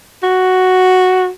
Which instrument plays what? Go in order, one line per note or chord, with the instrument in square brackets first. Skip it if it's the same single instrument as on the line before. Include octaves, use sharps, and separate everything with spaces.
[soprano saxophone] F#4